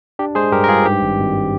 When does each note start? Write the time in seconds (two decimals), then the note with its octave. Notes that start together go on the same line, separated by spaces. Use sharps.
0.19 D4 G4
0.35 G#3 G#4 C5
0.52 G2 G4 A#4
0.64 A#4
0.68 G2 F4 G#4
0.85 G#2 G4
1.02 G#1
1.18 G#1